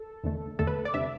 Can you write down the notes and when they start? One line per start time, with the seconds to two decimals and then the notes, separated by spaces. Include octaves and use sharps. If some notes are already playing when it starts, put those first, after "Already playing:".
Already playing: A4
0.24 E2 D3 A3
0.59 E2 D3 A3 A4
0.67 B4
0.85 D5
0.94 C3 G3 D4 E5